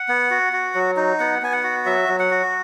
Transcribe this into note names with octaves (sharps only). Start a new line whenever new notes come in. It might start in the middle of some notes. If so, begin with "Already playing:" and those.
Already playing: F#5
B3
F#4
F#4
F#3
D#4
B3 F#5
B3 G#5
F#5
F#4
F#3 E5
F#3
F#5
F#4